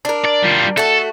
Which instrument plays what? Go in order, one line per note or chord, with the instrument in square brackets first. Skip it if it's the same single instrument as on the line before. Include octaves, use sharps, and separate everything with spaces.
[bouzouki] D4 A#4
[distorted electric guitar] D5
G3 F4
[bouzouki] A3 F#4 [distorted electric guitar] A4